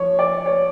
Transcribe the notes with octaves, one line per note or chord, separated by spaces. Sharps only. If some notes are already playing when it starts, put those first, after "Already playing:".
Already playing: F3 C#5
D5
C#5